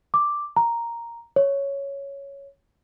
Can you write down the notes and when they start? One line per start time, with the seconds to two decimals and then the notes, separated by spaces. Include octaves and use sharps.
0.14 D6
0.57 A#5
1.36 C#5